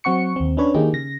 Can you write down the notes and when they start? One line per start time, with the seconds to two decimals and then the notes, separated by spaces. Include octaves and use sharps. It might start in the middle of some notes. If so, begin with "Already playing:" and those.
0.04 F#3 C4 F#5 C#6 C#7
0.36 D#2 C4
0.57 C#4 D4 B4 C#5
0.74 D#3 A#3 D#4 E4 G4 G#4
0.93 C#3 A#6